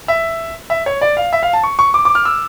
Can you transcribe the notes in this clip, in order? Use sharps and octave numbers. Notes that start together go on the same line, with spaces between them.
E5
E5
C#5
D5
F5
E5
F5
A5
C#6
C#6
D6
D6
F6
E6